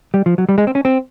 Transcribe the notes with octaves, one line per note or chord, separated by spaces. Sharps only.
G3
F3
F#3
G3
G#3
C4
C#4
C4